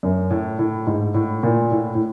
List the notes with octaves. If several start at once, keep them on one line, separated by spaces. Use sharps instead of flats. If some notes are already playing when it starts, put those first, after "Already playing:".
F#2
A2
A2
G#2
A2
A#2
A2
A2